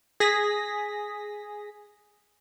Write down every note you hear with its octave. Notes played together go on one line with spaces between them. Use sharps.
G#4 A#6 B6